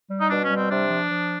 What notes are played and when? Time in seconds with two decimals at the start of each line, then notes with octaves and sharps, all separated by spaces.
0.10 G3
0.20 D#4
0.29 B2 D4
0.43 C#4
0.50 G3
0.56 C4
0.69 C3 D4
0.89 F3
1.09 F3